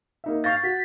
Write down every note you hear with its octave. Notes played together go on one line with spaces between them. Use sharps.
A#3 D#4 E5
F5 C#6 G6 A6 A#6
F#4 B6